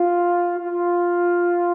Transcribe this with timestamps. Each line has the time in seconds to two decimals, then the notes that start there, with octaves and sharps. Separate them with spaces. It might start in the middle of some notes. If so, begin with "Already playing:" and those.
Already playing: F4
0.59 F4